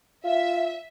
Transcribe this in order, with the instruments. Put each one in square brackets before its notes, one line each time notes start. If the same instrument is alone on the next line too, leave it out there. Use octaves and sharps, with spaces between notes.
[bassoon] F4 [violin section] E5